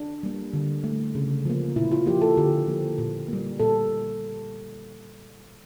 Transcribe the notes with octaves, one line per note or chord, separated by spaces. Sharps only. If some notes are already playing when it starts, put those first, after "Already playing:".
Already playing: D4
G3 A#3
D3
A3
C#3
F3 A#3
A#2 E4
F4
F3 A#3 G4
A4
D3 G4
F3 A#3
A#2
G3 A#3
A#2 A4